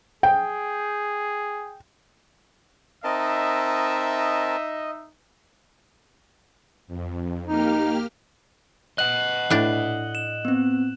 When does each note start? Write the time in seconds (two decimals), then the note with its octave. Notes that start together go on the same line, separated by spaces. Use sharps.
0.23 G#4 G5
3.04 C4 D#4 A#4 D#5 E5 A5
6.87 F2
7.47 A#3 D#4 G4 F6
8.98 D#5 F#5 F#6 F#7
9.50 A2 D4
10.15 E7
10.45 B3 C4